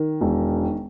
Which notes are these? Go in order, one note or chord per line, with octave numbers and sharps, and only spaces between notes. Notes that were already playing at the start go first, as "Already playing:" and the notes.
Already playing: D#3
E1